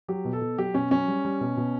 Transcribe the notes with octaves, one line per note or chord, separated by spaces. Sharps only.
F#3 G4
B2
A4
B2
F#3 G4
B2 C#4
F#3 C#4
G3
G3
B2
B2